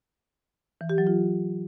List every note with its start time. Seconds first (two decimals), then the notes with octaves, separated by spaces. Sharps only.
0.81 E3
0.89 G4
0.98 F#3
1.07 F4